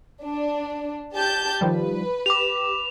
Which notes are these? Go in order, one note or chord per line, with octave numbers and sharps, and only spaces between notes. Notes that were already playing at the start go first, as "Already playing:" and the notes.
D4
G4 A5 G6
D#3 F3 G3 B4
G4 D6 F7